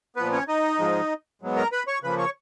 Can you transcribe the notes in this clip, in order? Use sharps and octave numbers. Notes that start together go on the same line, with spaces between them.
A#2 F3 B3 B4
C#4 C#5
D#4 D#5
G#2 F3 G#3
G#2 F#3 B3
A#4 A#5
B4 B5
C#5 C#6
C#3 F3 A#3 B4 B5
C#5 C#6